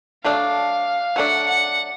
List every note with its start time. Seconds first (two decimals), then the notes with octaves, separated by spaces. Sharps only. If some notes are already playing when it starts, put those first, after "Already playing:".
0.24 F#3 A3 D4 F5
1.16 F#3 A3 D4 F#5
1.47 F#5